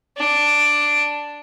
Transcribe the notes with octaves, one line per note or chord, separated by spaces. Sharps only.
D4